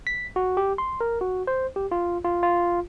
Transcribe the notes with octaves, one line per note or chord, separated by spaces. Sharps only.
B6
F#4
G4
C6
A#4
F#4
C5
G4
F4
F4
F4